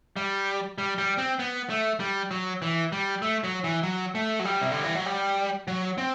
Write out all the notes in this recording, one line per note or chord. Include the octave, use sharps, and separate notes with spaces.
G3
G3
G3
C4
B3
A3
G3
F#3
E3
G3
A3
F#3
E3
F#3
A3
F#3
G3
C3
D3
E3
F#3
G3
F#3
C4